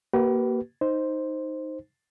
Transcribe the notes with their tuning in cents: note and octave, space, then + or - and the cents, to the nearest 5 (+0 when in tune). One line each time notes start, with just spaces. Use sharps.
A#3 +10 G4 -45 B4 +0
D#4 +0 C5 +0